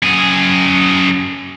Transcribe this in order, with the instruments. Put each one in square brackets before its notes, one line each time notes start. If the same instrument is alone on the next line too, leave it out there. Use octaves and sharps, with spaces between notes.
[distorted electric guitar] F#2 G#4